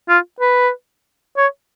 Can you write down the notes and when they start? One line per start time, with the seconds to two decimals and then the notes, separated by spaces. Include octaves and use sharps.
0.09 F4
0.41 B4
1.37 C#5